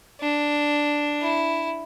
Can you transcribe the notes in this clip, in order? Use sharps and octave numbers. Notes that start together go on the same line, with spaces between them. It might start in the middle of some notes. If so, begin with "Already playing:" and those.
D4
E4